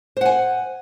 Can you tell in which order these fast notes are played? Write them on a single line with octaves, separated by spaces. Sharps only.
C5 F#5 G#5